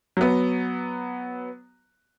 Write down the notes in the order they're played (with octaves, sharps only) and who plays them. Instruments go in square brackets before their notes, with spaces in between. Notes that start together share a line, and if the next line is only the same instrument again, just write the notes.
[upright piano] F#3 B3